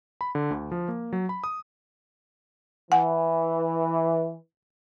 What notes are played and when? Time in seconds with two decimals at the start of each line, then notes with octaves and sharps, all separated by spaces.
0.21 B5
0.35 D3
0.51 D2
0.72 F3
0.88 A#3
1.13 F#3
1.29 B5
1.44 D#6
2.92 E3 F#5 G#5